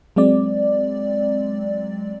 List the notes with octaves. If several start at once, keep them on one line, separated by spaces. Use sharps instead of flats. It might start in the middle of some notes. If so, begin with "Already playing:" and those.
F#3 G#3 C4 D5